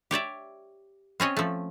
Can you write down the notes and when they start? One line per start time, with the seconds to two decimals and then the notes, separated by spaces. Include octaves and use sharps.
0.11 G4 C#5 D5 E5
1.20 C4 C#4 C#5 D#5
1.37 F3 A3